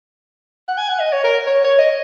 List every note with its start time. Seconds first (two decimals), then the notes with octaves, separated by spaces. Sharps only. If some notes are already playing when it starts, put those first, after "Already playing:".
0.68 F#5
0.77 G#5
0.89 F#5
1.00 D#5
1.13 C#5
1.24 A#4
1.47 C#5
1.64 C#5
1.79 D#5